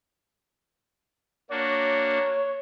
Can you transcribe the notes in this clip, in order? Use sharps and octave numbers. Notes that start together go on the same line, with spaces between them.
A#3 D4 F#4 C#5